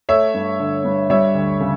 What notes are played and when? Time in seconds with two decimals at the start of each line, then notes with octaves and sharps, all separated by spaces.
0.09 A3 C#5 E5
0.34 G2
0.59 D3
0.85 G2
1.10 G3 C#5 E5
1.35 D2
1.60 C#3